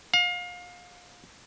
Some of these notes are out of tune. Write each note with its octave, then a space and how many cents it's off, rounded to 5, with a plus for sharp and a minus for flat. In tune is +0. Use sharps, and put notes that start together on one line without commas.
F5 +30